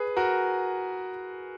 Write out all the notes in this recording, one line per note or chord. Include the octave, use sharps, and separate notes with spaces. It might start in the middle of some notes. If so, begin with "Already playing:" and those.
Already playing: G#4 B4
F#4 A#4